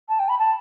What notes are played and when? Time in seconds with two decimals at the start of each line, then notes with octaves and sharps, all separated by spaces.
0.09 A5
0.19 G5
0.29 B5
0.39 A5